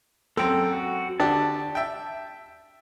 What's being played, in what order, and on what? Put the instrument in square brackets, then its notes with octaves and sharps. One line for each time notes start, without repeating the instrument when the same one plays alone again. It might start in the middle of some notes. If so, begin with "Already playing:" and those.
[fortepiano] F#2 C4 [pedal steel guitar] A4 G5
[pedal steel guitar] F#4
[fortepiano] D3 D4 G4 [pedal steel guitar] A5
[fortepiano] E5 G5